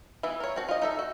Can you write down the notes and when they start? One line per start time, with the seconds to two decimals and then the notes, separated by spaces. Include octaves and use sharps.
0.23 E3 B3 E5
0.40 A#4 C#5
0.56 C4 F#4 A5
0.68 F4 D#5
0.82 D#4 A4 E5
0.99 F#4